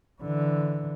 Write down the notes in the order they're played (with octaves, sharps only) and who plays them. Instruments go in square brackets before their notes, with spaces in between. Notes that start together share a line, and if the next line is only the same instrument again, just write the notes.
[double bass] D3 E3